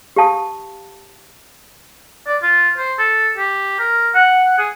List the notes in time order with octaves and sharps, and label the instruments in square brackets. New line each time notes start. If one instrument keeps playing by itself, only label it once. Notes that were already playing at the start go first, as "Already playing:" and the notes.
[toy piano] G4 F5 A5 D#6
[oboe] D5
F4
C5
A4
G4
A#4
F#5
G#4